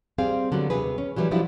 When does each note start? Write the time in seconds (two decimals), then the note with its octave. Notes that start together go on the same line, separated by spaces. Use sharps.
0.18 G3 C4 G#4 F5
0.52 D3 F#3 G3 B3
0.70 D#2 C3 G#4 B4
0.98 C#4
1.16 E3 F#3 G3 E4 B4
1.31 F3 F#3 D4 E4 F#4 G4